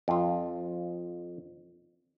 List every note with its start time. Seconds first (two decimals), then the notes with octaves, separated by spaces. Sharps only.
0.08 F2 F4